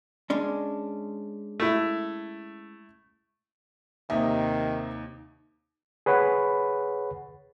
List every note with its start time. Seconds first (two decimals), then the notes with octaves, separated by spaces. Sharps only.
0.30 G#3 C#4 D4
1.60 A3 E4
4.10 D#2 C3 D#3 D#4 E5
6.06 G#4 B4 C#5 F#5 B5